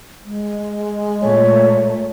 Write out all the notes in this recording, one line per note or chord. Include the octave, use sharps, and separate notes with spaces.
G#3
A#2 A3 C#5